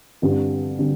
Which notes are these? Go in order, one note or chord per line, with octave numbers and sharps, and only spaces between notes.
G1 G2 D3 G3 C4
D3 G3 C4